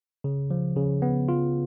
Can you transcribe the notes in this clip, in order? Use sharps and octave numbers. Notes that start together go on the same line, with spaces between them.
C#3
F3
C#3
B3
F4